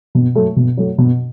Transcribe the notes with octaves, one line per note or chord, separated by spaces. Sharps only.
B2
F#3 A3
B2
F#3 A3
B2